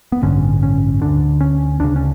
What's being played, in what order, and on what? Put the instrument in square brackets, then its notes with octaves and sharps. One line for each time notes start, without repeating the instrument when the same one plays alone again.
[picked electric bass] B3
A1 G2 D3 C#4
C#4
D2 D3 D4
C#4
D2 C#3 D4
C#4